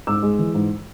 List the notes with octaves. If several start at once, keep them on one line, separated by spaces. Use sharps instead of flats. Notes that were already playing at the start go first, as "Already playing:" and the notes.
G#2 D6 E6
G#3
E3
G#2